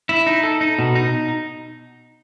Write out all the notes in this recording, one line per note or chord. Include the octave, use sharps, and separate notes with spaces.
E4
D#4
A4
D#4
B2
D#4